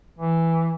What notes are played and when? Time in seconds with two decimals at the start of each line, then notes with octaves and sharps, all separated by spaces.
0.19 E3